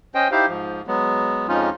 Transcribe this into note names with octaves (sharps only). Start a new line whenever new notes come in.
C#4 C5 D#5 G5
D#4 E4 G4 C5 F5
G#2 F3
F#3 G#3 B3
F2 F3 G#3 C#4 D#4 F4